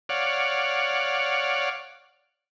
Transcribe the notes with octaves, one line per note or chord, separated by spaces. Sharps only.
C#5 D5 F5 F#5